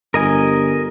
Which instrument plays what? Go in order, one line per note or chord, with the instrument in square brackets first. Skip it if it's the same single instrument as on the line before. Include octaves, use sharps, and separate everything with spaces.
[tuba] G1 [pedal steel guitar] A#4 D#5 G#5